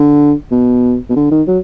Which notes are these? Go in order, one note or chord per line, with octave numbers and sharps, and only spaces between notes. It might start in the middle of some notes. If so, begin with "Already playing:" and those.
Already playing: D3
B2
B2
D3
D#3
F#3